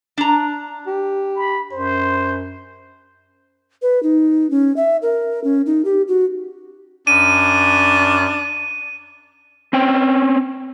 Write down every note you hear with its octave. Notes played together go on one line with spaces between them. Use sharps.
D4 A#5
G4
B5
F#2 C5
B4
D#4
C#4
E5
A#4
C#4
D#4
G4
F#4
F#2 C#4 D4 D#7
C4 C#4 G5